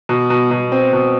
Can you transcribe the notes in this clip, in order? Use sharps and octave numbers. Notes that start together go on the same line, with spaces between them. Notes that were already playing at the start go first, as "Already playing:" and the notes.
B2
B2
B2
C4
B2